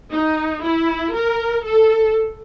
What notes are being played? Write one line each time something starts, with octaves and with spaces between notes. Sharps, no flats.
D#4
E4
A#4
A4